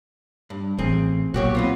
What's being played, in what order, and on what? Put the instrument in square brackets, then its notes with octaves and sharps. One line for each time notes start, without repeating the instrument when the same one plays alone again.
[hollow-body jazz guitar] G2
[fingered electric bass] A1 [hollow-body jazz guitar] C4 G#4
[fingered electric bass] B1 A#2 [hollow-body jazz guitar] F#4 G4 C#5
[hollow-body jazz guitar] B3 C4 F4